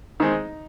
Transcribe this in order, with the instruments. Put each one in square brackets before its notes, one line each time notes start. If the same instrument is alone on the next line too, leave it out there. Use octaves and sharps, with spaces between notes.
[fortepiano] D#3 G#3 C4 D#4